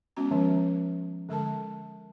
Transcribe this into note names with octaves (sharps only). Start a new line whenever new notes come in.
G#3 B3 C#4 F#4 A#5
D#3 F3 G#3 C#4
D3 G#3 A4 A#4 A5